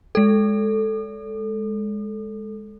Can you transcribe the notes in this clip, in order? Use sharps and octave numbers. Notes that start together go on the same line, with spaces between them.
G#3 A4